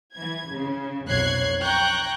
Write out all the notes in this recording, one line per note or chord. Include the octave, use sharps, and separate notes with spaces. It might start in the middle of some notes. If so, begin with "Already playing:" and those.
E3 G#6
C#3
B1 F2 C#5 F#6 G#6 C7
G5 A#5 C#6 F#6 G6